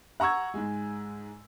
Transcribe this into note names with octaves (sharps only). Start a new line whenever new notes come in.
F#5 A#5 C#6 E6 G#6
G#2 G#3